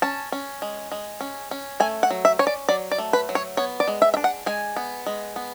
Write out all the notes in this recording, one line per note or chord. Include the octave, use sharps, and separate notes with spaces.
C#4 A5
C#4
G#3
G#3
C#4
C#4
A3 G#5
F#5
F#3
E5
C#4 C#5
D5
F#3 D5
D5
A3
B4
F#3
C#5
B3 C#5
D5
G#3
E5
E5
D4
F#5
G#3 G#5
B3
G#3
B3